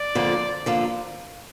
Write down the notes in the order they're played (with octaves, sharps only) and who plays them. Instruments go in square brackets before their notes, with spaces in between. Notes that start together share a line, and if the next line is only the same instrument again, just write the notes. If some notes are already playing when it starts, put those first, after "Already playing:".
Already playing: [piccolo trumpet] D5
[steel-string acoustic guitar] F2 D3 F3 A#3
D3 F3 A#3